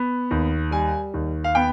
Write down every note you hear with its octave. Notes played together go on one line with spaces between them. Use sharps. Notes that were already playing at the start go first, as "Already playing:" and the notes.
Already playing: B3
D#2
G3 G#5
D#2
F5
B3 G5